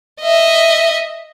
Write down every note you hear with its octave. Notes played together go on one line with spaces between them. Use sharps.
D#5 E5